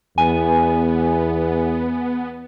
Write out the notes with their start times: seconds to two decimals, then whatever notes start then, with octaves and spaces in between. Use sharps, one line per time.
0.18 E2 B3 G#5